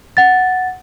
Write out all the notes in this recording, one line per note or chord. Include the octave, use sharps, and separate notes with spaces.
F#5 A6